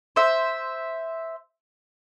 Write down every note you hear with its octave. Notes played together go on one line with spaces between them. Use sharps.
C5 E5